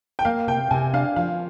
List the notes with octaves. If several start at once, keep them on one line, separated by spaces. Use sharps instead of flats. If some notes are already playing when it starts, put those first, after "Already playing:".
G5
A#3 F5
C3 G5
C3 G#5
D4 F5
F3 F5